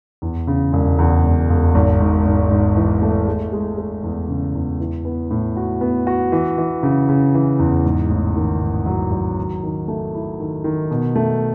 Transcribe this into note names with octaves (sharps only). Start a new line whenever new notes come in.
E2
C#3
E1
E2
E1
E1
G#1
G#2
G#2
G#2
E3
A3
G#3
G#3
G#3
E2
C#3
E2
E3
B3
A2
F#4
B3
F#4
E3
E3
C#3
C#3
E3
E2
G#2
A1
D#3
G#2
F#3
F#3
D#3
D#3
A3
E4
D#3
D#3
B2
A3